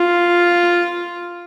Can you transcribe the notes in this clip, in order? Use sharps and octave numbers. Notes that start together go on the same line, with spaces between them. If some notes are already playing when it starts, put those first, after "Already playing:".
Already playing: F4